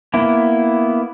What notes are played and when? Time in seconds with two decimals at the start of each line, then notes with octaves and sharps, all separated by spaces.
0.14 A#3 B3 E4